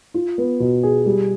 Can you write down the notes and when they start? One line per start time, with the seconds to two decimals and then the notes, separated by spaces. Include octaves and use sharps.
0.14 F4
0.38 B3
0.60 B2
0.83 G#4
1.06 G3